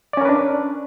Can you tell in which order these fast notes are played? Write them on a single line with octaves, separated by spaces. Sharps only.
D5 C#4 A#4 B4 D4